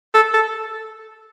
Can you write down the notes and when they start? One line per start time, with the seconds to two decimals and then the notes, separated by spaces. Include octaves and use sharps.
0.14 A4
0.34 A4